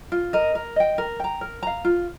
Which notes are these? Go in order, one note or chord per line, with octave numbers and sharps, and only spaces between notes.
F4
A#4 D#5
A#4
D#5 G5
A#4
G5 A#5
A#4
F5 A#5
F4